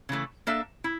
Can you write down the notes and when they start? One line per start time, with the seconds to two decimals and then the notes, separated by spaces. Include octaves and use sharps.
0.09 C#3 E3 A3
0.47 A#3 D4 A4 E5
0.84 E4